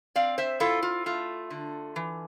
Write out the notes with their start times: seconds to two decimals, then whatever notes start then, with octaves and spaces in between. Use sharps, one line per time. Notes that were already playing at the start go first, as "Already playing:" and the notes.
0.16 C4 D5 F5
0.38 C5 E5
0.60 E4 F4 A4
0.83 F4
1.06 A3 F4
1.50 D3
1.96 E3